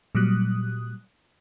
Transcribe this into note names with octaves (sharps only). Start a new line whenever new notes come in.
A#2 F#3 G3 D#6 F#6